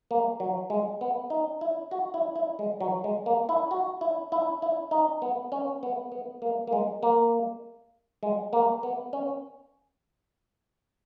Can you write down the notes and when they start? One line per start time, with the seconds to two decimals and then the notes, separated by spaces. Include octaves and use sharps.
0.11 A#3
0.40 F#3
0.70 G#3
1.01 B3
1.30 D#4
1.61 E4
1.91 F#4
2.14 E4
2.36 E4
2.59 G#3
2.81 F#3
3.04 G#3
3.26 A#3
3.49 E4
3.71 F#4
4.01 E4
4.32 E4
4.62 E4
4.91 D#4
5.22 B3
5.52 C#4
5.83 B3
6.12 B3
6.42 A#3
6.67 A#3
6.73 G#3
7.03 A#3
8.23 G#3
8.53 A#3
8.83 B3
9.13 C#4